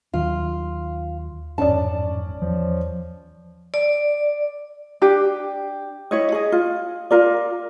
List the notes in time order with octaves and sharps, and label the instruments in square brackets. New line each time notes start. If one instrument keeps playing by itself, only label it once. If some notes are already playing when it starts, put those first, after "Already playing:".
[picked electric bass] D#2 D#3 F#3 [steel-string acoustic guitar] F4
[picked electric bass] A1 F2 G#2 [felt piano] C#4 C#5 D5 [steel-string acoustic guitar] A5
[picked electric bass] E2 [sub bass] F3
[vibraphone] D5
[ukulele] D4 G4
E4 C#5 D#5
G#4 D#5
F4
F4 A#4 D5